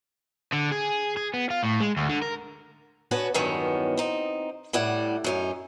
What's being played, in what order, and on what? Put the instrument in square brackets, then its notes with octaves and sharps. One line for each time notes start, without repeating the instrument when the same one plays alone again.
[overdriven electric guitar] D3
G#4
G#4
B3
F4
A2
G#3
D2
D3
A#4
[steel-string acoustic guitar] B3 C#4 D4 F#4 B4
E2 G2 D#3 F#3 B3 C#4
C4 D#4
A2 G3 E4 D5 F#5
F#2 C#4 D#4